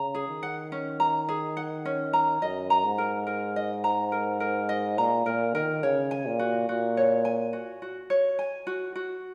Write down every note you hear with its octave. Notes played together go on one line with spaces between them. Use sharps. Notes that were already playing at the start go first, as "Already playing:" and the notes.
Already playing: C#3 A#5
G#4
D#3
F#5
C#4
A#5
G#4
F#5
C#4
A#5
F#2 D#5
A#5
G#2
A#4
A#4
D#5
A#5
A#4
A#4
D#5
A#2 A#5
A#2 A#4
D#3 A#4
C#3 C#5
G#5
A#2
F#4
A#2 F#4
C#5
G#5
F#4
F#4
C#5
G#5
F#4
F#4